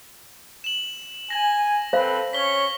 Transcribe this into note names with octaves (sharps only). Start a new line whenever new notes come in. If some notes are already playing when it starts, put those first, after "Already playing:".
E7 F#7
G#5 A#6 F#7
C4 A4 B4 C5 F5
C#4 C#5 B6 G7